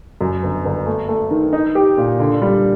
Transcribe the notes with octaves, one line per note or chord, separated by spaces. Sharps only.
F#2
G1
G1
A3
A3
D#3
D#4
G4
A#2
D3
G3